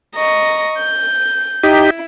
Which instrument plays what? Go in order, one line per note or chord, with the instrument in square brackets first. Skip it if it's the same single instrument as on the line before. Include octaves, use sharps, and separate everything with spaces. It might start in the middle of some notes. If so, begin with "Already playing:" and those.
[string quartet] D#5 A#5 C#6
G6
[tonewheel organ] D#4 G4 [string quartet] E4